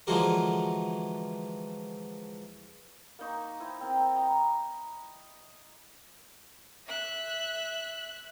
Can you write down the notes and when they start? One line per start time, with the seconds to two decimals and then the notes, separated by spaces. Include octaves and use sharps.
0.07 D3 E3 F3 G#3 F#4 A#4
3.19 A#3 D#4 C#6
3.60 E4 C5 G#5
3.81 C4 A#4 G5
4.16 D#5 A#5 B5
6.87 E5 F#6